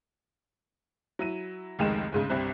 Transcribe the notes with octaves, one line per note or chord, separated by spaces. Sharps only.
F#3 E4 D#7
F1 C#2 D#3 G#3 G5 E7
D2 G#2 C#3
G1 C2 G2 C4 F#6